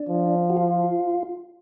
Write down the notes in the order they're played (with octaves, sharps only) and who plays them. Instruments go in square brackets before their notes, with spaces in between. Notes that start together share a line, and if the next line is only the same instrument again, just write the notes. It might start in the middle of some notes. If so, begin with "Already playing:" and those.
Already playing: [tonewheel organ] D4
[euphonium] F3
[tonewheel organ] F#4
F4